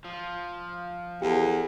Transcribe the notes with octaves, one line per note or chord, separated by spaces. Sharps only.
F3
E2 G4 A4